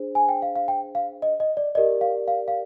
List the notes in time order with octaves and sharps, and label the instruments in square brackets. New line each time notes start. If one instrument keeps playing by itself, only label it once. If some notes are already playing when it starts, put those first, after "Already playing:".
Already playing: [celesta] D4 G#4 C5
G#5
G5
F5
F5
G5
F5
D#5
D#5
D5
G4 A#4 D5 D#5
F5
F5
F5